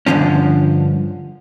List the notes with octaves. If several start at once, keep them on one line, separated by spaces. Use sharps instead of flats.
G2 B2 D3 F3 C#4